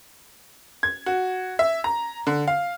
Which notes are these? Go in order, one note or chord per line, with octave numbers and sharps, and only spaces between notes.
G#6
F#4
E5
A#5
D3
F5